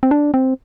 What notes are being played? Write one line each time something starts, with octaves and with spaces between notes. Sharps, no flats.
C4
D4
C4